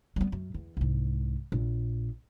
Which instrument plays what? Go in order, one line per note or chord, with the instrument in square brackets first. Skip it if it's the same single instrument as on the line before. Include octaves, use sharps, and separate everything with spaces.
[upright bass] G3 B3
F#2
E2
C2 G#2
A#1